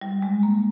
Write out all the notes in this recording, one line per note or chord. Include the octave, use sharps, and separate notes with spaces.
G3
G#3
A#3